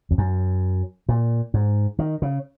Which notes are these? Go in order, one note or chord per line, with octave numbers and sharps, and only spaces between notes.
F2
F#2
A#2
G#2
D#3
C#3